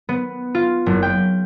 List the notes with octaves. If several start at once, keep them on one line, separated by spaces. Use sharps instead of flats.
B3
F4
F#1
G5